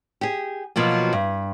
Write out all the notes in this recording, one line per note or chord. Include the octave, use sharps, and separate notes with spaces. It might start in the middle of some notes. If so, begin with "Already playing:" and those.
G4 G#4
B2 F3 F#3 A#3
G2